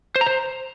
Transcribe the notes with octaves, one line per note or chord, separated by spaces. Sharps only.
C5
A#5
C5